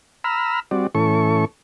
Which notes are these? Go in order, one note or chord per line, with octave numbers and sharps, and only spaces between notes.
A#5 B5 E6 F6
G3 C4 F#4 D5
A2 E3 C#4 A4 C#6